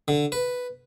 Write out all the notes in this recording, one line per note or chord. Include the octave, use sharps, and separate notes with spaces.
D3
B4